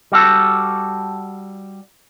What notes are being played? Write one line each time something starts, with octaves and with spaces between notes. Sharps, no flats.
G3 F#4 A4